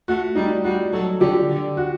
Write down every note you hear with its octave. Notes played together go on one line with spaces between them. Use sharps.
A3 F#4
G3 D#4
G3 F#4
F#3 A4
D3 G4
D3
F#4